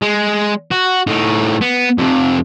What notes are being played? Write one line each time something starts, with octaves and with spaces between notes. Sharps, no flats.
G#3
F#4
A2 D#4
B3
F2 C3